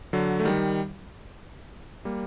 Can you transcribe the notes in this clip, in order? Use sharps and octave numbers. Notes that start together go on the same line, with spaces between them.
D3 F#3
A3
D#3 G3
G3 A#3